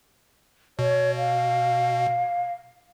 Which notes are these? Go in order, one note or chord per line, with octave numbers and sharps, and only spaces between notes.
B2 C#5
F5